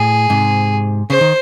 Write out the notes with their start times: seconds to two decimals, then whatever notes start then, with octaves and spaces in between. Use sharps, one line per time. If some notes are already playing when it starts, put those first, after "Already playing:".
Already playing: A2 G#4
0.30 G#2 C3
1.10 C#3 C5
1.21 D#3